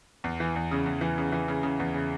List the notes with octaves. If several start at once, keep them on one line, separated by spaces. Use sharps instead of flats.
E2
E3
E2
C#3
E2
E3
C#3
E3
C#3
C#3
E2
C#3